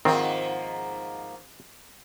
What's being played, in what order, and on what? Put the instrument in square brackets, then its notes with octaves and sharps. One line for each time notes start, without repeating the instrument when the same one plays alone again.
[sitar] G#2 F3 A#3 [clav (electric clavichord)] D#3 C4